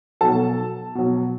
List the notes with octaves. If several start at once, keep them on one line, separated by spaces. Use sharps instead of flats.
B2 F#3 A4 A5
B2 F#3